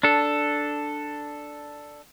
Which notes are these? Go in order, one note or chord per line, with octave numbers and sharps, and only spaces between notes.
D4 A4